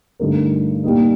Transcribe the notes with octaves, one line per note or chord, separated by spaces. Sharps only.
G2 D3 A3 D#4 A#4
A#2 G3 A#3 D#4